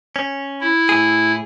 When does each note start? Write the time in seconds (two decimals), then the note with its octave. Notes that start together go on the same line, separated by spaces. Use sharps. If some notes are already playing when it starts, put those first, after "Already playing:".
0.16 C#4
0.61 E4
0.89 A2 G#4